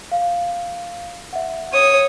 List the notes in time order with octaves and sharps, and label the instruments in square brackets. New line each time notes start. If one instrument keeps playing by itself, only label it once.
[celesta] F5
E5 F#5
[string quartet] C#5 D#6